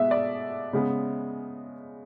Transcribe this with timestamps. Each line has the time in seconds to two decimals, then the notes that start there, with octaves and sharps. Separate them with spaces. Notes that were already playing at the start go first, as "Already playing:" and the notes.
Already playing: B2 G#3 B3 E5
0.11 D5
0.73 C#3 G#3 B3